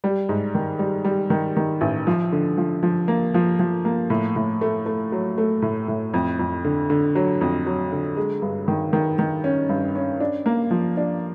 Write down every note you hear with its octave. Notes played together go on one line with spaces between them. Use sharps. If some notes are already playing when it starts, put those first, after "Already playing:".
G3
G#2
D#3
G3
G3
D#3
D#3
A1
F3
D3
F3
F3
A#3
F3
F3
A#3
A2
A2
A3
A3
F#3
A3
A2
A2
F2
F2
D3
D3
F#3
F2
F#3
D3
G#3
G2
D#3
D#3
D#3
C#4
G2
C#4
D4
A#3
F3
D4